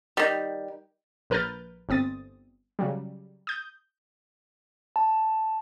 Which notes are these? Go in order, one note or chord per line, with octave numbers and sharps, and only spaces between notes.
D#3 G3
A#1 A#4 B4 F6 G6 A6
G1 C4 D#6 A6
C#3 F#3 G3
D#6 G6
A5